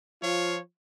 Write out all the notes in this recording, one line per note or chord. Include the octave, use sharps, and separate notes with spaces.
F3 F4 C#5